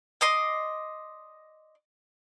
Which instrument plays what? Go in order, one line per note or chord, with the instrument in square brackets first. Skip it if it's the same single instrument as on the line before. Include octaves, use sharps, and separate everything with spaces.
[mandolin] D5 D#5 C6